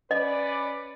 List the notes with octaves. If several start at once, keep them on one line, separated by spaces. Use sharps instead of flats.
C#4 B4 D5 D#5